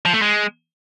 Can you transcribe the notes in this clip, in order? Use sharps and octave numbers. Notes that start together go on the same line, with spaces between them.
F3
A3
G#3